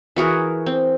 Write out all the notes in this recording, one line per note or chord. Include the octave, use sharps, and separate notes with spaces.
E3 F#4 G#4 A#4
C4